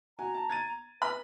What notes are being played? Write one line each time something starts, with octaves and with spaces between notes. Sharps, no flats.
F#4 G#5 A#5
A5
G#6 A6 D#7
B4 B5